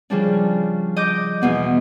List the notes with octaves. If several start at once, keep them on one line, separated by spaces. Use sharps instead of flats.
C#3 F3 G3 D4
D#5 D6 G6
E2 B2 B3